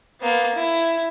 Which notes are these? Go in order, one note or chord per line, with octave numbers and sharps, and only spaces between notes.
A#3 B3
E4